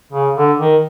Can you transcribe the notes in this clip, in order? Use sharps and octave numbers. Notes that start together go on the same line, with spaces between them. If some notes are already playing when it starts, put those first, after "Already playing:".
C#3
D3
D#3